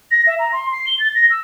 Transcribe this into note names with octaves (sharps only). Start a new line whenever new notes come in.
A#6
E5
A#5
C6
C7
G7
A6
A#6
E6